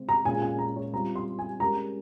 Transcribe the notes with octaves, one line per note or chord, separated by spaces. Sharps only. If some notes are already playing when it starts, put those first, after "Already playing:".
Already playing: C#3 G#3 C4
A#5
A#2 G#3 C#4 F4 G#4 G#5
G#5
A#5
C#5
G3 C4 F4 A#5
C6
G#5
G#3 C#4 G4 A#4 A#5